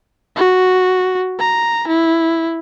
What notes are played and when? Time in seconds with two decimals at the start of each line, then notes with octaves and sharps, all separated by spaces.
0.36 F#4
1.39 A#5
1.88 E4